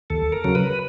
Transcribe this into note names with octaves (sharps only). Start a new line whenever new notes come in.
D#2 A4
A#4
C#3 F#3
B4